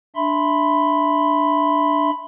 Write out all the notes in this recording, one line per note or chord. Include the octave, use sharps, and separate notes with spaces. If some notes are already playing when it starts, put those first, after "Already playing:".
D4 E5 B5 C6